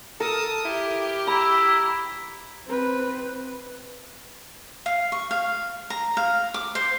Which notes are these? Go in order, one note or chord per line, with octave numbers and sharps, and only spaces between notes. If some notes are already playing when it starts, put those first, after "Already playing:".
A4 A#4 A5 D#6
E4 G4
E4 A#5 B5
C4 B4
F5
C#6
F5
A#5
F5
D6
C5